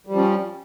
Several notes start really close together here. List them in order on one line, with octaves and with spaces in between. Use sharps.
G3 F3 C#4